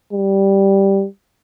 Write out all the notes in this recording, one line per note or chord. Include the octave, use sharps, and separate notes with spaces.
G3